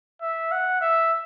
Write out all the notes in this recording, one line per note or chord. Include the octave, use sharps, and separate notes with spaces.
E5
F#5
E5